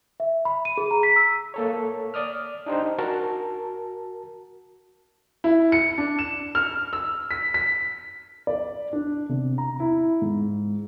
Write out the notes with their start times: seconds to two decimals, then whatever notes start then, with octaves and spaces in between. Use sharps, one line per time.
0.20 E5
0.45 B5
0.65 D#7
0.77 G#4
0.91 A#5
1.03 B6
1.16 E6
1.54 A#3 A4 C#5
2.14 D5 D#6 F6
2.66 D4 D#4 G4 C5
2.99 F#4 A#4 A5
5.44 E4
5.72 C#7
5.98 D4
6.19 E7
6.55 F6
6.93 E6
7.31 B6
7.54 B6
8.47 D5
8.93 D4
9.29 C3
9.58 A#5
9.80 E4
10.22 G#2